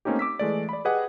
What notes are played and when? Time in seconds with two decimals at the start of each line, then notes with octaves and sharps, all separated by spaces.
0.05 A3 A#3 C4 C#4 D#4 G4
0.19 D6 E6 B6
0.39 E3 G#3 A3 D5
0.69 D5 B5
0.85 G4 G#4 B4 D#5 F#5